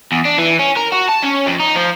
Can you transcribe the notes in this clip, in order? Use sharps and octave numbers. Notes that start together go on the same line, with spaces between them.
E2
D4
E3
C#4
A#4
F#4
A5
C#4
F2
D#4
F3